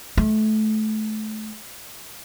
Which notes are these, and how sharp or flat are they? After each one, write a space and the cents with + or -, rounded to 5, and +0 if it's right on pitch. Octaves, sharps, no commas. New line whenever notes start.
A3 -25